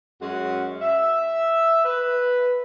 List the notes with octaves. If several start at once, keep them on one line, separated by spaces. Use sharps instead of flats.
F#2 G#3 F#4
E5
B4